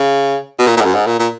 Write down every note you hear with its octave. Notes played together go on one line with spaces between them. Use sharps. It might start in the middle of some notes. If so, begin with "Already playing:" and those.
Already playing: C#3
B2
A#2
A#2
G#2
F#2
G#2
A#2
A#2